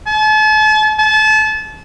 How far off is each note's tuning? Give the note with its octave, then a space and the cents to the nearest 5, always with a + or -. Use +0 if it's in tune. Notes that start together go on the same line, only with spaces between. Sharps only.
A5 -40
A5 -30